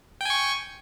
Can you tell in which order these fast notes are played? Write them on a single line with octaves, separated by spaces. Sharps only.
G5 G#5 C#6